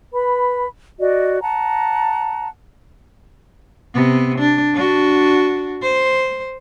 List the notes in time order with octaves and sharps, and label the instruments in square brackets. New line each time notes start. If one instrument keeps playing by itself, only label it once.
[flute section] B4 B5
F#4 D5 D#5
F#5 A5 A#5
[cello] C3 B3
D4
D4 F#4
C5